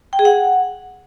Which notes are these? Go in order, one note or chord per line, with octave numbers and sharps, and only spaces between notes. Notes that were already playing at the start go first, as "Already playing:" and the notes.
G5
G#4
F#5